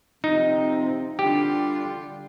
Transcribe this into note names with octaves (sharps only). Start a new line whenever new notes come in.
C3 F3 C4 D#4
D3 G3 D4 F4 G4